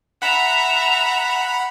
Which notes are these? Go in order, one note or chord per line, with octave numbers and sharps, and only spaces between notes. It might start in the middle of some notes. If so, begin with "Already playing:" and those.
E5 F#5 A#5 B5